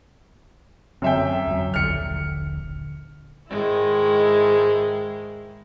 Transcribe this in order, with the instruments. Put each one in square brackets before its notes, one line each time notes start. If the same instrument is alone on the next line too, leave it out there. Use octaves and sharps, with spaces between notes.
[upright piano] F#2 E5 G5 [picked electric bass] D3 F#3 C4
[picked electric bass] F2 F#3
[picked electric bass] D#1 A#1 D3 [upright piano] F6 C#7
[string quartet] G#2 D#3 G#3 E4